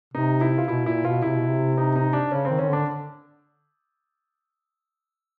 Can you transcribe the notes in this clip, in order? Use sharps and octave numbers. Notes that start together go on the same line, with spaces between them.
C3 D#4
E4
F4
B2 E4
A#2 E4
B2 F4
C3 E4
B2
C3
D#4
D#4
D4
C#3 C#4
D#3 C4
D#3 C#4
D3 D4